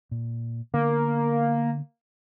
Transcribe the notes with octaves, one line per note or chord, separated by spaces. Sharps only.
A#2
D3 A#3 B3